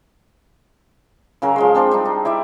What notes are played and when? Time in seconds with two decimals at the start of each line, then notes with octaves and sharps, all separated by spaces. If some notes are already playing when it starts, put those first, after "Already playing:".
1.42 C#3 F#3 A#4 G#5
1.56 F3 G#3 C6
1.75 C4 D4 C5 A5
1.91 G3 D4 D#4
2.05 D#4
2.25 E4 D5 E5